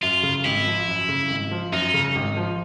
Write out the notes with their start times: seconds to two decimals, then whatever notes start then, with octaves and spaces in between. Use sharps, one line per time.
0.02 F#2 F4
0.23 C#3
0.45 G#1 E4
0.67 F3
0.88 F#2
1.09 C#3
1.30 G#1
1.51 F3
1.72 F#2 D#4
1.94 C#3
2.16 G#1
2.37 F3